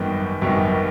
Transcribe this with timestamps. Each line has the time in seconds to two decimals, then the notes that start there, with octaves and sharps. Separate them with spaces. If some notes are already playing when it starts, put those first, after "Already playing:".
Already playing: G#1 F#2 D#3 G3 B3
0.41 G#1 F#2 D#3 G3 B3